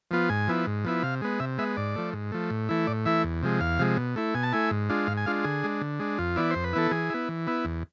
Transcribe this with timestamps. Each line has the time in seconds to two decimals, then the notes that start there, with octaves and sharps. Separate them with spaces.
0.11 F3 B3 F4
0.29 G#2 G#5
0.48 F3 B3 E4
0.67 G#2
0.85 F3 B3 E4
1.03 C3 F5
1.22 G#3 B3
1.40 C3 E5
1.58 G#3 B3 E5
1.77 G#2 D5
1.96 F3 A3
2.13 G#2
2.32 F3 A3
2.50 A2
2.69 E3 A3 E4
2.87 A2 D5
3.06 E3 A3 E4 E5
3.24 E2
3.43 C3 F3 G#3
3.60 E2 F5
3.79 C3 F3 G#3
3.97 B2
4.16 A3 E4
4.35 B2 G#5
4.43 A5
4.53 A3 E4 G#5
4.71 G#2
4.89 G#3 D4 F4
5.07 G#2 F5
5.17 G#5
5.26 G#3 D4 F4 F5
5.44 D3 G#4
5.63 G#3 D4
5.81 D3
6.00 G#3 D4
6.18 F2 F4
6.36 E3 B3 E4 D5
6.51 F2 C5
6.64 B4
6.73 E3 B3 E4 A4
6.91 E3 G#4
7.10 B3 E4
7.29 E3
7.47 B3 E4
7.65 E2